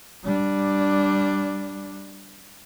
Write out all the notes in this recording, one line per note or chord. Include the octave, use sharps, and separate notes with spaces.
G3 D4